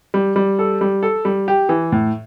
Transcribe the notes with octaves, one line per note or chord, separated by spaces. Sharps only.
G3
G3
A4
G3
A4
G3
G4
E3
A2